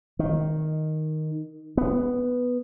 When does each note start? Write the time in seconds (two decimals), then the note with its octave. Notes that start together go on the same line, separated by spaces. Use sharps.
0.19 D#3
1.77 B3